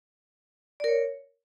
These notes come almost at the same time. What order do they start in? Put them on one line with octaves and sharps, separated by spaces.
D5 A#4 C#5